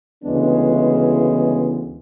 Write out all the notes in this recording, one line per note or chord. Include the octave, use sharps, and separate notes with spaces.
D2 C#3 E3 G#3 B3 D4
E4